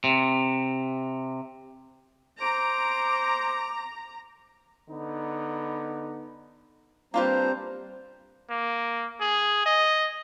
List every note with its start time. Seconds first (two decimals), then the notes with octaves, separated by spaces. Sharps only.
0.04 C3
2.41 C5 A#5 D6 D7
4.88 D3 B3 D#4
7.14 G3 A#3 C4 D4 F4 B4 C5 A#5
8.50 A#3
9.20 G#4
9.66 D#5